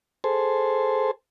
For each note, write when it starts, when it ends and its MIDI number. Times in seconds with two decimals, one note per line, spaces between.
0.24 1.11 68
0.24 1.11 69
0.24 1.11 72